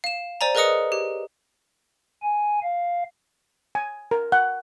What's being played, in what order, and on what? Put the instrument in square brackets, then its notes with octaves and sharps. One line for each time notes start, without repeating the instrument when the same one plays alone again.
[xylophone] F5 E7
C5 D5 G#5 A#5
G#4 A#4 B4 D#5 D#6 C#7
G4
[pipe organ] G#5
F5
[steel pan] G#5
A#4
F#5